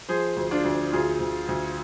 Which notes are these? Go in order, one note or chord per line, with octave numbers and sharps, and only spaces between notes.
F3 G#4 C5
D2
D4 F4
D2
D2 F4 G#4
D2
D2